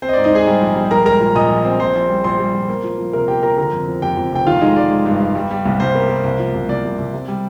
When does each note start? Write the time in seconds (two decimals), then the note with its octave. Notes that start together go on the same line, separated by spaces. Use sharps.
0.02 C4 C5
0.09 D#5
0.13 G#2 D5
0.24 D#4 D#5
0.32 G#2 G#4 G#5
0.47 G3
0.61 A#1
0.76 G3
0.91 A#1 A#4 A#5
1.06 G#3 A#4 A#5
1.21 A#2
1.35 A#2 D#5 D#6
1.50 A#1
1.65 C4
1.80 A#1 C5 C6
1.95 A#1
2.09 G3
2.24 A#1 C5 C6
2.40 G3
2.54 A#1
2.69 A#3
2.84 F3
2.98 F3
3.13 C3 A#4 A#5
3.28 A#3 G4 G5
3.43 F3 A#4 A#5
3.58 D3 A#4 A#5
3.73 F2
3.88 F3
4.02 F2 G4 G5
4.17 F2
4.32 F1 G5
4.47 D#3 F4 F5
4.61 G#3 D#4 D#5
4.76 G#3 D5
4.91 G#3
5.06 G2
5.20 G2
5.35 G3
5.51 G3
5.65 C2
5.80 C2 C5
5.95 A#3
6.09 A#3
6.24 C2
6.39 F3
6.54 C2
6.69 C2 D5
6.84 C2
6.98 C2
7.13 C3
7.28 G3